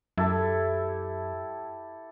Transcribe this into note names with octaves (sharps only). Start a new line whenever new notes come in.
F#2 E4 G4 A4